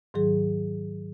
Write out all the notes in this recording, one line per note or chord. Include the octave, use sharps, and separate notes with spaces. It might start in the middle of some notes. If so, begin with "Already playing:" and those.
G#2 D#3 F#3 G#4